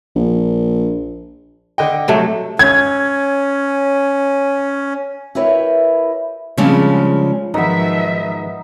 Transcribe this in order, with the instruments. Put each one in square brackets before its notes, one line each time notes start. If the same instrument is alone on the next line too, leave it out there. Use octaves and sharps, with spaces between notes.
[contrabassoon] A#1
[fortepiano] D3 D#5 G5
[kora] C3 F#3 A3
[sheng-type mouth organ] C#4 [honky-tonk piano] G#6
[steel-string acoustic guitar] E4 G4 A#4 B4 C#5 E5
[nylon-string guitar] C#3 F3 G3 G#3 C4 D4
[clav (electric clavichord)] G#2 D#3 F#3 [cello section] F3 E5 [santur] B3 D#4 [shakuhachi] B4